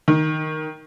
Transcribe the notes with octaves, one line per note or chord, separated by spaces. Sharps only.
D#3